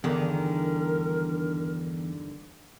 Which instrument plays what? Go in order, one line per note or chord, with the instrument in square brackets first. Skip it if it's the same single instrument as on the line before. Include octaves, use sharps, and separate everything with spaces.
[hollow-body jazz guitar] E2 [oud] G2 D3 D#3 [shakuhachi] A#4